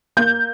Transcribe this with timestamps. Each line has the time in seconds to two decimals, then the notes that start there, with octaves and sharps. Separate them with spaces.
0.17 A#3 G6